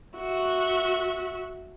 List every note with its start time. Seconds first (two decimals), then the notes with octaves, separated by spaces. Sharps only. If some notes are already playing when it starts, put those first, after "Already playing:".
0.16 F#4 E5